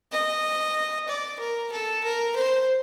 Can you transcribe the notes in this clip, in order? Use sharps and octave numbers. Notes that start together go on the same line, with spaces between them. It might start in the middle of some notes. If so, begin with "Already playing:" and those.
D#5
D5
A#4
A4
A#4
C5